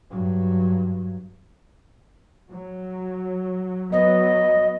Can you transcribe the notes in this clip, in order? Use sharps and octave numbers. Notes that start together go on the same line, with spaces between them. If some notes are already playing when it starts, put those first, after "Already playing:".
G2 F#3
F#3
F#3 B3 D#5